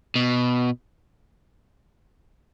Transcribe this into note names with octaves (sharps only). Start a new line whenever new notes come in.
B2